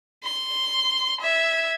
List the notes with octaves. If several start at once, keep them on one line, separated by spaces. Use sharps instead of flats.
C6
E5 G#6